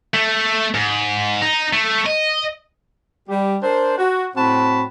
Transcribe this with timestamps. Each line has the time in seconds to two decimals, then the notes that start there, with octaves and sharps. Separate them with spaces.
0.14 A3
0.74 G#2
1.42 D#4
1.73 A3
2.06 D#5
3.28 G3 G4
3.63 D4 A#4 C5
3.98 F#4
4.36 A2 C4 F#4 A5 B5